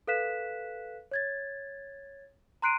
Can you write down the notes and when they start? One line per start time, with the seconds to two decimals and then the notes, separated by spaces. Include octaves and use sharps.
0.07 A4 B4 F5 F#6 B6 E7
1.11 C#5 G#6 A6
2.62 A#5 C6 F#6 C7 D7 D#7